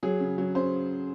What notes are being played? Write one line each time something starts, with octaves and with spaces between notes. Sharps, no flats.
F#3 G#4
C#3
F#3
C#3 C5